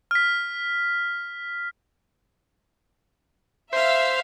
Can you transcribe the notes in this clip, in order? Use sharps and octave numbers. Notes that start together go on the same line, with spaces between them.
F6 B6
C5 E5 F5